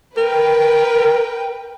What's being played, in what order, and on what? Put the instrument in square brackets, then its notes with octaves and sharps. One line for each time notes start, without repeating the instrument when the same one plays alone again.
[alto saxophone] A#4 [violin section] B4 G5